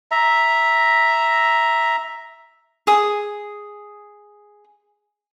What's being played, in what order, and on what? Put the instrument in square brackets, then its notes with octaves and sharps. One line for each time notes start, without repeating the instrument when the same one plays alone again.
[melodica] E5 A#5
[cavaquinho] G#4 D#6